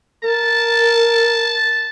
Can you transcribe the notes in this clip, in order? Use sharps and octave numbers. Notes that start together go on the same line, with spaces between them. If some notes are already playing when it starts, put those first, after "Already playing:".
A#4 A5